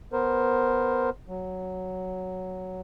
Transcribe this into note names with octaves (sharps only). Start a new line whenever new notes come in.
B3 A#4 C5
F#3